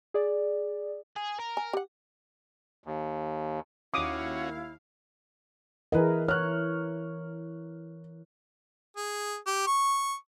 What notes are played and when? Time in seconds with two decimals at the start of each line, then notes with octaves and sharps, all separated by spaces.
0.14 G#4 D5
1.16 G#4
1.39 A#4
1.57 G#5
1.73 G4 F#5
2.84 D#2
3.94 D#2 C#4 E4 F#4 F5 D6 D#6
5.92 E3 E4 G#4 A#4 B4 D#5
6.28 C#5 F6 F#6
8.97 G#4
9.47 G4
9.67 C#6